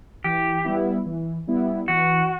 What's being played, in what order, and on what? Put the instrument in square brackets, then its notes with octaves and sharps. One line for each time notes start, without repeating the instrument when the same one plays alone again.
[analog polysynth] E3 [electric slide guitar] G4
[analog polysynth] G3 B3 E4
E3
G3 B3 E4
[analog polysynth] E3 [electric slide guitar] F#4